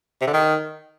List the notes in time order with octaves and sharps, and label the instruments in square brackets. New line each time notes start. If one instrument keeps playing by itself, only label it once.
[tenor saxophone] C3
D3
D#3